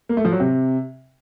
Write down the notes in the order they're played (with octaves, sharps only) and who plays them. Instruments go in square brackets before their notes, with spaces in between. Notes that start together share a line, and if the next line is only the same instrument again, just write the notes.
[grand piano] A#3
A3
F3
F#3
C3